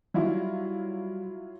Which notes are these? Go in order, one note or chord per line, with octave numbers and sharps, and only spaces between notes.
F#3 G3 E4 F4